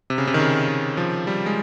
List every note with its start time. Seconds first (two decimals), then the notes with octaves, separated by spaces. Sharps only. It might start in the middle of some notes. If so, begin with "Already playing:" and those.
0.10 C3
0.18 C#3
0.27 C3
0.34 D#3
0.40 C#3
0.68 D#3
0.97 F3
1.27 G3
1.46 G#3